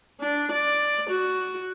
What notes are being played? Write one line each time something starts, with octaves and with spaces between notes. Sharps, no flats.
D4
D5
F#4